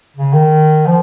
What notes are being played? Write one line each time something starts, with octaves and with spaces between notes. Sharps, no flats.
C#3
D#3
F3